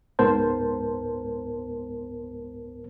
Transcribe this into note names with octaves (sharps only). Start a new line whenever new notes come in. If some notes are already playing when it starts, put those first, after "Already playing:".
C#2 G#2 B3 A#4 C5 A5